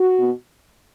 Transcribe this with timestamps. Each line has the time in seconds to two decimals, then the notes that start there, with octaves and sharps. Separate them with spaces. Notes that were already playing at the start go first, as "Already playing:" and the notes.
Already playing: F#4
0.18 B2 B3